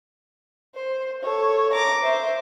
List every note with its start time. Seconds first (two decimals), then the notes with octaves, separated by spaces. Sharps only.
0.76 C5
1.22 A4 C#5
1.73 A#5 D6
2.03 C5 E5